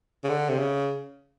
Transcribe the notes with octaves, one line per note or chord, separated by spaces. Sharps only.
C#3
D3
C3
C#3